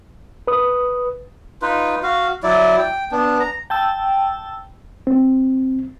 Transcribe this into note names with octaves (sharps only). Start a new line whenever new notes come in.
B4 D#6
D#4 F4 B4
F#4 F5
F#3 E4 D5
G5
B3 D4
A#5
G5 A5 E6
C4